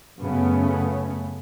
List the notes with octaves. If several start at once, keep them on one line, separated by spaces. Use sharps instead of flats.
F#2 C#3 A3 B3 C#4